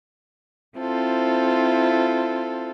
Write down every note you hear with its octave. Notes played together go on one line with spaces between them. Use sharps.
C4 E4 F4 A4 C5